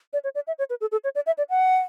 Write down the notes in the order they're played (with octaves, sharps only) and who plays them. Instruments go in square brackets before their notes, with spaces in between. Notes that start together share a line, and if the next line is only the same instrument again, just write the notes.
[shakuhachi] D5
C#5
D5
E5
C#5
B4
A4
A4
C#5
D5
E5
D5
F#5